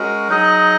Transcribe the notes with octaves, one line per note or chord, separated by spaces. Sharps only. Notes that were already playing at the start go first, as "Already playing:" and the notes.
Already playing: G#3 C#4 F#4 A#4
F#3 D#4 G#4 D#5